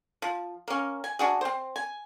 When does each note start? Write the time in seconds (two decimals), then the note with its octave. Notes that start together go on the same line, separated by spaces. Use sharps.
0.22 F3
0.68 A#3 C#4
1.04 G#5
1.19 D4 F#4 G#4
1.41 C4 C5
1.76 G#5